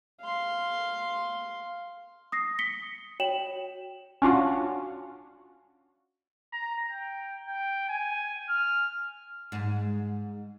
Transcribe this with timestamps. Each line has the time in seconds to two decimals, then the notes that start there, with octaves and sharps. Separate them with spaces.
0.20 F5 C6
2.32 D#6 A#6 C7
2.59 B6 C#7 G7
3.20 F#4 C#5 G5 E7 F#7
4.22 C#4 D4 F4 F#4
6.53 A#5
6.91 G5
7.48 G5
7.89 G#5
8.49 F6
9.52 G#2